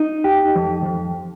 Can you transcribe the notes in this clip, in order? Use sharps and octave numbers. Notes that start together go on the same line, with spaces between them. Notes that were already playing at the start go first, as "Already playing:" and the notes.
Already playing: D#4
G4
F2
F2